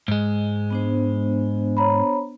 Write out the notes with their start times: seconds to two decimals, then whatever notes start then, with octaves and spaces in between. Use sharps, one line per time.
0.08 G#2 G#3
0.71 B3 D4 C5
1.77 C#5 A#5 B5